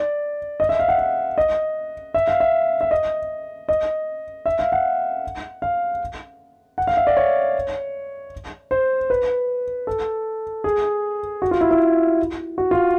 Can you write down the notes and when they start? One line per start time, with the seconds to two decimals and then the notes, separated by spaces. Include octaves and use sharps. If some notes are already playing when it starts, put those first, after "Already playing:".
Already playing: D5
0.60 D#5
0.69 E5
0.79 F5
0.88 F#5
0.98 F5
1.38 D#5
2.14 E5
2.28 F5
2.40 E5
2.81 E5
2.91 D#5
3.69 D#5
4.46 E5
4.59 F5
4.72 F#5
5.62 F5
6.78 F#5
6.87 F5
6.97 E5
7.07 D5
7.17 C#5
8.71 C5
9.10 B4
9.87 A4
10.64 G#4
11.42 F#4
11.51 F4
11.61 E4
11.71 E4
12.58 F#4
12.71 F4